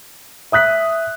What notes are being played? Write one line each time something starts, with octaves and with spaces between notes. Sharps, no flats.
E5 D#6 F#6 B6